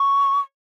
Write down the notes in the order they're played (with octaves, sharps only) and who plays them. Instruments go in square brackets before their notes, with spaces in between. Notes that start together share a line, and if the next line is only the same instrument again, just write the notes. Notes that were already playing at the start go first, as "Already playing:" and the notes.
Already playing: [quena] C#6